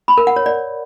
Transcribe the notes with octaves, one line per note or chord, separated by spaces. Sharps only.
B5
A#4
F#5
C#5
D5